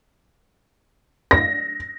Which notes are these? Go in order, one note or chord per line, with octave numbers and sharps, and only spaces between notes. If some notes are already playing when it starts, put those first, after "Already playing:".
A#6